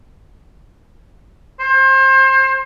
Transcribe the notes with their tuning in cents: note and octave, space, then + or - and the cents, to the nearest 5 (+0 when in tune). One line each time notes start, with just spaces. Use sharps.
C5 +30